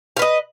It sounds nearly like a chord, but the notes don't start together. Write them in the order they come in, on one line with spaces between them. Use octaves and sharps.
F5 B4 D#5